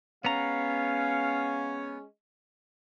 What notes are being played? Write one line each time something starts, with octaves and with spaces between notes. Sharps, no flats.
G#3 B3 C#4 F5 A#5